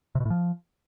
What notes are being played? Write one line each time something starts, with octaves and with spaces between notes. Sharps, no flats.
C3
B2
A2
F3